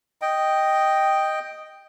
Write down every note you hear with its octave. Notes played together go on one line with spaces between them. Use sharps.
D#5 G5